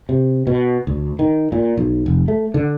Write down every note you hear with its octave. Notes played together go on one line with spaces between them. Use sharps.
C3
B2
D2
D#3
A#2
B1
F1
A3
D3